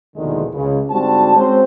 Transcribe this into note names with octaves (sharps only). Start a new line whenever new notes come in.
A#1 E2 B2 D3 D#3 G#3
C#2 C#3
G#2 D3 G3 C4 F#4 A5
G#3 C4 C#4 F#4 C5